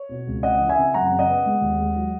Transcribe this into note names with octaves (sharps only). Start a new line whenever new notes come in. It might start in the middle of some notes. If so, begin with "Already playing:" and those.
Already playing: C#5
B2
C#2
C#3 D#5 F#5
E3
E5 G#5
C#3
F#2 F#5 A#5
C#3
D#5 F#5
B3
G#3
D#2
G#3
F#3